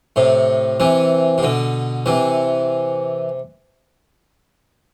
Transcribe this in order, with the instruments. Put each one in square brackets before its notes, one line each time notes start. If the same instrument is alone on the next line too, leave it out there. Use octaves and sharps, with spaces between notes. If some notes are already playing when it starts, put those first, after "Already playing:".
[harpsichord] A2 C3
C3 E3
C3
B2 D3
C3 E3